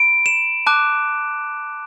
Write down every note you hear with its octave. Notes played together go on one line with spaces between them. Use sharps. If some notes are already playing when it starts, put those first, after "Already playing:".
Already playing: B5 D7
E7
A5 D6 F#6